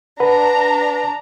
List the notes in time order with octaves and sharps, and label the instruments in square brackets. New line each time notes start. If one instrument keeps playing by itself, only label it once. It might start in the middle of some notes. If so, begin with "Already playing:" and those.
[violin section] D4 A#5 [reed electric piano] B4 F#5